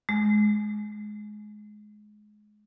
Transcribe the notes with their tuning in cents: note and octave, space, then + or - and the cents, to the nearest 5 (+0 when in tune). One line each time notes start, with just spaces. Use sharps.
G#3 +20